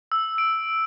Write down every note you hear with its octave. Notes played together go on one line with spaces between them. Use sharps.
E6
D7